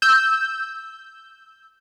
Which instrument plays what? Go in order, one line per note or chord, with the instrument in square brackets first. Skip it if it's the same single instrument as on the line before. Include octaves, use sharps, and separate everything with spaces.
[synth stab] E6 G6